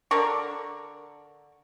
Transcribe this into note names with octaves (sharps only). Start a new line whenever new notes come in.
D3 A#4 C#6